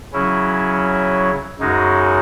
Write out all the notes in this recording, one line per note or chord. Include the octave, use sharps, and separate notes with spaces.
C#3 F#3 C#4 E4
F#2 C#3 G#3 D#4 F#4